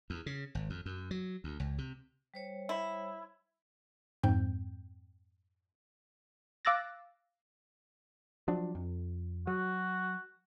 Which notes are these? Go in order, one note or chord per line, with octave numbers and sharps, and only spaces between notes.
E2
C#3
G#1
F2
F#2
F#3
D2
C#2
C3
G3 C5 C#5
E4
F2 G#2 C4 G5 G6
F5 D6 E6 F#6 A6 A#6
F3 F#3 D4
F2
F#3 F#4